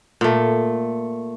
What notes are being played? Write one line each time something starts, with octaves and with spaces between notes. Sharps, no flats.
A#2 A3